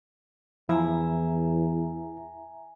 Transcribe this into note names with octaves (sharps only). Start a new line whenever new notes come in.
E2 F3 E4 E5 G#5 A#5